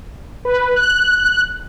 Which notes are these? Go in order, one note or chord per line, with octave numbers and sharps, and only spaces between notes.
B4
F#6